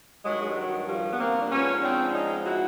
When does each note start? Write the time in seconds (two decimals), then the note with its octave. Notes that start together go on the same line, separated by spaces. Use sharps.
0.24 G2 D#3 F#3 G#3
0.41 G#3
0.49 G3
0.56 F#3
0.88 F3 G3
1.12 B3
1.19 A#3 C4
1.41 D4
1.50 G#2 F3 B3 C#4
1.82 C4 D4
2.14 C#4 D#4
2.45 E4 F#4